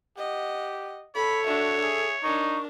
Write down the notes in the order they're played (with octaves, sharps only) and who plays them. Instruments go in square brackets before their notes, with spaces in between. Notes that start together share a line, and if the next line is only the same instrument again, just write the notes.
[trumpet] G4 [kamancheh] D#5 F#5
[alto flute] A4 [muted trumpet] C#5 [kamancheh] B5
[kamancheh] D4 E5 [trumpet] F#4
[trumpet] G#4 [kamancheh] E5
[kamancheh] D4 A#4 [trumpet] D#4 [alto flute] C#6